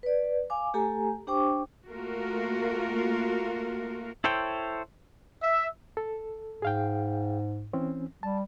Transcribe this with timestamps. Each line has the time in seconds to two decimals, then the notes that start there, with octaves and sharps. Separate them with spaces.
0.03 B4 D5
0.50 F5 G#5 D6
0.74 A3 G4 A4 G#5 A#5
1.27 D4 G4 C5 G5 C#6 D6
1.88 A3 A#3 F4 F#4 A#4
4.24 E4 A4 C5 C#5 G5
5.43 E5
5.97 A4
6.62 G#2 G#4 F5 G5
7.73 E3 C4 C#4
8.23 G3 A5